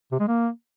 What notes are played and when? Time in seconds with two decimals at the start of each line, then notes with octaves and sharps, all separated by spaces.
0.12 C3
0.20 G#3
0.28 A#3